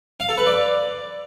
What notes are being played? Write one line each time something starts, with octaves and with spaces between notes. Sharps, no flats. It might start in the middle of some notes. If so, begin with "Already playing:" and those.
F5
A4
B4
D5